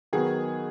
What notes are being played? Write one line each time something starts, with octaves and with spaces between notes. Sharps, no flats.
D#3 F#3 B3 G#4